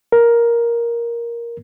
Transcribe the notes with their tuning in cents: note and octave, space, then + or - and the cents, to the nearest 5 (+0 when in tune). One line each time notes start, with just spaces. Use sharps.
A#4 +10